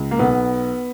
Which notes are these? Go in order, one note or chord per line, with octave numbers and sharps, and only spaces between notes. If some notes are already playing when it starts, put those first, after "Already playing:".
Already playing: C#2
A#3
B1 B3